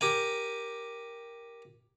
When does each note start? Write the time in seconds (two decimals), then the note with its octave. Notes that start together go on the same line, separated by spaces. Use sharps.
0.01 G4 A#4 G#5